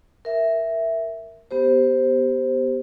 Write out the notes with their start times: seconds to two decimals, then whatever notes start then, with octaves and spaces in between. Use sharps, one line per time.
0.25 A#4 E5
1.51 B3 G4 C5